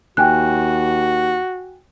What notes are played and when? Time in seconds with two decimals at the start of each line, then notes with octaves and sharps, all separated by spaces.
0.17 D#2 F#4 G5 G#5 F#6